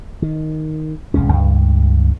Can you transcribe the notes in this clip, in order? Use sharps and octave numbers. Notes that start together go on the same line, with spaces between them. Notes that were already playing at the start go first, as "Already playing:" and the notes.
D#3
D1 C2 G#3 C#4
C#2 G2